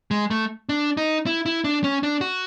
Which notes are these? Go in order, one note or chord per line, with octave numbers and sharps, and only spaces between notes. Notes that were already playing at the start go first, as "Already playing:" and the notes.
G#3
A3
D4
D#4
E4
E4
D4
C#4
D4
F#4